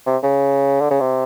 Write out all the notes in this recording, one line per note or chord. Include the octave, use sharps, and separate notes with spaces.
C3
C#3
D3
C#3
C3